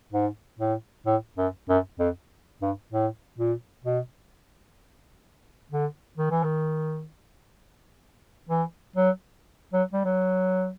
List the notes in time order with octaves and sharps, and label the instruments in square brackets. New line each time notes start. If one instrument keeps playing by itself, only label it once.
[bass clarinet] G#2
A2
A2
F#2
F#2
F2
G2
A2
A#2
B2
D3
D#3
E3
D#3
E3
F#3
F#3
G3
F#3